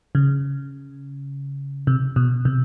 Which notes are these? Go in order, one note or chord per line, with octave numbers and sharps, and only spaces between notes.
C#3
C3
B2
C3